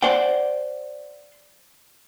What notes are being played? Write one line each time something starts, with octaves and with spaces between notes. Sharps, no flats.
C5 D5 F#5 G5